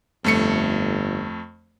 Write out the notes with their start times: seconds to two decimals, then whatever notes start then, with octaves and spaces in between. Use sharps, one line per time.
0.24 G1 F2 A3 C#7